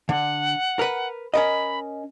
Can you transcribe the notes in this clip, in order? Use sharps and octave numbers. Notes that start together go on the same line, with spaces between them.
D3 F#5
A#4 B4
C#4 A#4 D#5 B5